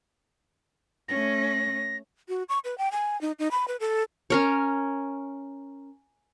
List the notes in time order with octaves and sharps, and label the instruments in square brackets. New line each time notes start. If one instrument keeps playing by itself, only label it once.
[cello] A3 C#4 [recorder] A#6
[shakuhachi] F#4
C#6
B4
G5
G#5
D#4
D#4
B5
B4
A4
[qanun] C#4 A#4 C#5